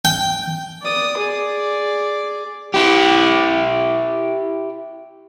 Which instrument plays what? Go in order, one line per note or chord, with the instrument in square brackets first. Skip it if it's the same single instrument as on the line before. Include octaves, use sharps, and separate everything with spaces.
[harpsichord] G5
[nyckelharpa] D5 D#6
G#4 D5
[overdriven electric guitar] E4 G4